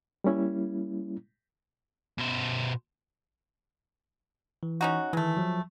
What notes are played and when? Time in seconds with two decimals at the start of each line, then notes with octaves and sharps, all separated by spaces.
0.24 G3 A#3 C#4 E4
2.18 B2 C5
4.63 E3
4.81 C#4 D#4 F#4
5.13 D#3 E3 G#3 A3
5.37 F3 F#3